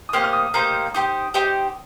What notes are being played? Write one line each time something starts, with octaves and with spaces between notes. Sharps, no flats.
D#6
A#3 D#4 G4 C5 F6
F6
D#6
A#3 D#4 G4 C5 A#5
D#4 G4 C5 D#6
D#4 G4 C5